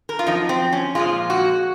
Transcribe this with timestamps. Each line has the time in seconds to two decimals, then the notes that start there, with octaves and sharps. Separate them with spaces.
0.09 A#4
0.19 F4
0.26 F#2 F3 D#4
0.49 C4
0.73 C#4
0.95 A#2 F3 G#3 F4
1.30 F#4